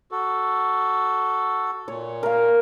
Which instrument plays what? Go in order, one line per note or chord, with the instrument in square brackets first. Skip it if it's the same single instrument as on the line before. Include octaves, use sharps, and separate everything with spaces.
[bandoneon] F#4 A4
[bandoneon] A#2 [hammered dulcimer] C#5
[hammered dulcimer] A#4 F5